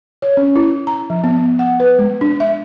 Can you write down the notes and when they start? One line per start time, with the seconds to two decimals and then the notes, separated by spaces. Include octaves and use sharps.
0.22 C#5
0.37 C#4
0.56 E4
0.87 A#5
1.10 F3
1.24 B3
1.59 F#5
1.80 B4
1.99 G#3
2.21 D4
2.40 E5